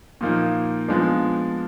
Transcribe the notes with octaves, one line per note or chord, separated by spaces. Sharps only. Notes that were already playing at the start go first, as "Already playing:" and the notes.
A#2 F3 A#3 D#4
F3 G#3 B3 D4